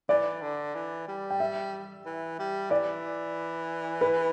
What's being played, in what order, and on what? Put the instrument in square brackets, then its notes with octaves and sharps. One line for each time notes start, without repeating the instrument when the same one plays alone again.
[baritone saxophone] E3 [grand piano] D5
[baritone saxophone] D3
E3
G3
[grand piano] G5
E5
[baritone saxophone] E3
G3
[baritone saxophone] E3 [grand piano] D5
[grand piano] B4